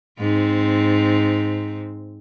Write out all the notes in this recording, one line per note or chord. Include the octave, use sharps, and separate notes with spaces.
G#2 C4